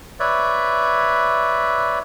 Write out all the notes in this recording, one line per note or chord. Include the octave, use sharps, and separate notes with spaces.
B4 C#5 D5 E5